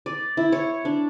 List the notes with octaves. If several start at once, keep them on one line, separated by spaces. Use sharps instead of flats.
D5
E4
C#5
D4